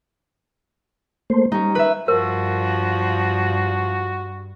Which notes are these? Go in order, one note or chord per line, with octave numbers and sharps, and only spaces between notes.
A3 A#3 C5
G3 C#4 D#4
B4 E5
G2 F3 F#4 A#4